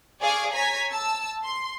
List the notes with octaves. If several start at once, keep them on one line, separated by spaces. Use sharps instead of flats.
G#4 D5 F5 G#5 C#6 D6
C#5 G#5 A#5 G#6 B6
A5 E6
C6